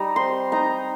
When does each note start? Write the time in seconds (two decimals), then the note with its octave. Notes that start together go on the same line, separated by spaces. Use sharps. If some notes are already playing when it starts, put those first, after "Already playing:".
Already playing: G3 D#4 A#5
0.16 C4 C6
0.52 D#4 A#5